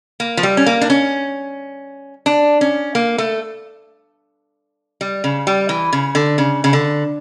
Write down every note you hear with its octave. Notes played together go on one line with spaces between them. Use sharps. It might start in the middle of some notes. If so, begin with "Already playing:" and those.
A#3
F3
G3
C#4
A#3
D4
C#4
D4
C#4
A#3
A3
G3
C#3
G3
E3
C#3
D3
C#3
C#3
D3